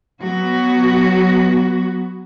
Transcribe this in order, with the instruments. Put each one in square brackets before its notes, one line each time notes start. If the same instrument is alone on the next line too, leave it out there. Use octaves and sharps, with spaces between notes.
[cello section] F#3 B3 F#4